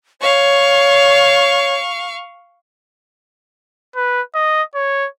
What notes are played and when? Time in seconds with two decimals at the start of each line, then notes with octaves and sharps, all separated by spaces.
0.22 C#5 F5 C#6
3.96 B4
4.35 D#5
4.74 C#5